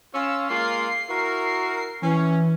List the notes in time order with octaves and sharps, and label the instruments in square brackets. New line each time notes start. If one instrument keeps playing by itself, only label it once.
[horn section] C#4 F4 [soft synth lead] E6
[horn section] G#3 A#3 F4 [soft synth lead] C7
[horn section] E4 F#4 A#4
[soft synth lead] E3 [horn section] C#4